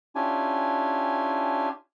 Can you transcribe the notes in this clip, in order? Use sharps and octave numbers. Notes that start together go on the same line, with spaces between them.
C#4 D4 E4 F4 G4 G#5